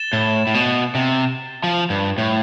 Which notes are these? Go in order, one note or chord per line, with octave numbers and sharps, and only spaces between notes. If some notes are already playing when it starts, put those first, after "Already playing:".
Already playing: A6 E7 G7
A2
A2
B2
C3
F3
G2
A2